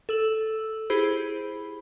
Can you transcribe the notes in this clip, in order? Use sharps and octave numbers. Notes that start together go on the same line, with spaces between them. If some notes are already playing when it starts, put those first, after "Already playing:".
A4 E6 F#7
E4 G4 G#4 C5 B5